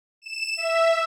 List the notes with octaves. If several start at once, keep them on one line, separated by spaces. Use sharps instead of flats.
E7
E5